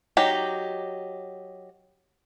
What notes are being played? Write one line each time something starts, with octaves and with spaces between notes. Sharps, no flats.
F#3 D#4 G4